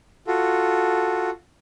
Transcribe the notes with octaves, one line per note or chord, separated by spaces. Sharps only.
F4 F#4 A4